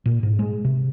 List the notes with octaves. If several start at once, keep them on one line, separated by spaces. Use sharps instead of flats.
A#2
G#2
G#3
C3